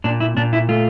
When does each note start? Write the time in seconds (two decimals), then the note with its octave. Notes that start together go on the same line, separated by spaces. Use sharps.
0.04 A#2 D4
0.20 E4
0.37 A#2 D4
0.53 E4
0.69 A3 F4